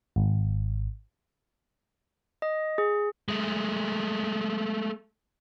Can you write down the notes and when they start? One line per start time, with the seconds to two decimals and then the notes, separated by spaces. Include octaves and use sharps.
0.16 G#1
2.42 D#5
2.78 G#4
3.28 G#3 A3